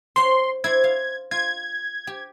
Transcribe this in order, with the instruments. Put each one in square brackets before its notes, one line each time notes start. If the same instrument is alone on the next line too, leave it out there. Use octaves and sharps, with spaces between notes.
[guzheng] C5 C#5 F#5 [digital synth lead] C6
[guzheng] E4 C5 D5 [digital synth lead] G#6
[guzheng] F5
[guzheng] F4 [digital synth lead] G#6
[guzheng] G4